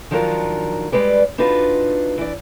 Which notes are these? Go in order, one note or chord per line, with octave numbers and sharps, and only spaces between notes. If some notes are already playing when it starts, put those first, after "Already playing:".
D#3 F3 F#3 D4 F4 A#4
G3 G#3 B4 D5
D4 D#4 F4 F#4 B4
E3 D5